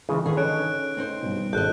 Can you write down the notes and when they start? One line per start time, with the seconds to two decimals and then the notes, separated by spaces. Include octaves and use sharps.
0.09 C#3 E3 G#3 D#4 G#4
0.26 D3 D#3 D#4 G#4 A4 B4
0.37 C#4 A4 C#5 D#5 F#6 D7
0.97 C4 D#4 C5
1.23 G2 B2
1.53 G#1 A4 D#5 F#6 G6